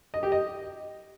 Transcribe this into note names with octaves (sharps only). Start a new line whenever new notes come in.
D#5
G4
D#5